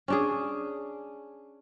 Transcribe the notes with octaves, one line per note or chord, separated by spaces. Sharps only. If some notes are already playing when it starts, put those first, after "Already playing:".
C#4 D4 G#4